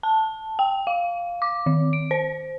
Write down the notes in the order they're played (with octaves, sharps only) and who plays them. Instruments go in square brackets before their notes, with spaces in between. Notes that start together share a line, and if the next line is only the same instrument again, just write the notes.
[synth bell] A5
G5
F5
D6
D#3
D7
C5